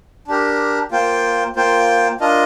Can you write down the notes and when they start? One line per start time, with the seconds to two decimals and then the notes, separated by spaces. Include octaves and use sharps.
0.28 D4 G4 A#4
0.92 A#3 F4 C5 G5
1.56 A#3 F4 C5 G5
2.20 D4 F4 A#4 D#5